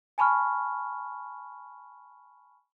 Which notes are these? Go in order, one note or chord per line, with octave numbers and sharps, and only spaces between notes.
G#5 A5 B5 C#6 F6